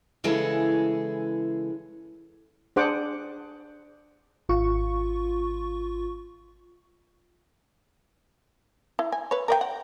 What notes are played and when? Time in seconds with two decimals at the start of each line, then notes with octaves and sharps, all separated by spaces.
0.24 C#3 E3 G#3 E4 G#4 A4
2.76 D4 G#4 C5 F#5 D6
4.49 G#1 F4 C#6
8.99 E4
9.12 G#5
9.31 B4 C#5
9.48 A#4 D5 G5
9.61 F#5